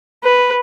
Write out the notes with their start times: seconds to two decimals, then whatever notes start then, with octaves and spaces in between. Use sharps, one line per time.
0.24 B4